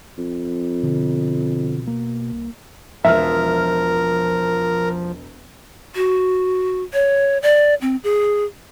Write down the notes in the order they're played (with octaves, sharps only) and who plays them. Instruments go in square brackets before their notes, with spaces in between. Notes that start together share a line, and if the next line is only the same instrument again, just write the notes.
[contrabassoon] F2
[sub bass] B2 [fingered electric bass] D3
[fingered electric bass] A#3
[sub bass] C2
[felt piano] E1 F6 [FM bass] F3 [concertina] A#4 [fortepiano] E5
[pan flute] F#4
C#5
D5
C4
G#4